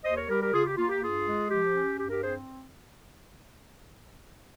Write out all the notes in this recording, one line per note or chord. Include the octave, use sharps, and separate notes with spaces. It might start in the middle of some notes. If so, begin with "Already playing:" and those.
D#2 C5 D#5
A#4 C#5
G3 G4 A#4
G4 A#4
C#3 F4 G#4
G4
A#3 F4
G4
G2 F4 G#4
G#3
F3 G4
C#4
G2 G4
G4 A#4
C4 G#4 C5